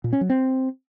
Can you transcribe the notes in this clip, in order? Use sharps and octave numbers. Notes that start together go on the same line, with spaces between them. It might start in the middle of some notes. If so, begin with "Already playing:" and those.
A#2
C#4
F#3
C4